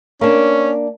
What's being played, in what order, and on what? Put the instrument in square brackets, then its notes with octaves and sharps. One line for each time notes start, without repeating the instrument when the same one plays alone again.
[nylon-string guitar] A#3 D4 [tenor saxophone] C#4